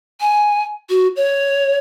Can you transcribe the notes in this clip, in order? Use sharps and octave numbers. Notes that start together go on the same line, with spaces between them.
G#5
F#4
C#5